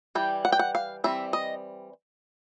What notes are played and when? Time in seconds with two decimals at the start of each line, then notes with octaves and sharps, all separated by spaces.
0.15 E3 G3 G5
0.45 F#5
0.52 G5
0.59 F#5
0.75 F5
1.04 E3 G3 C4 E5
1.33 D#5